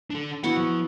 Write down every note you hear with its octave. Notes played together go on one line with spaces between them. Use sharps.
D4 A4
B3 E4 F#4 F#5
F3